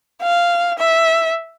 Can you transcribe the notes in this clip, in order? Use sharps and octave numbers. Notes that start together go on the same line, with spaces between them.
F5
E5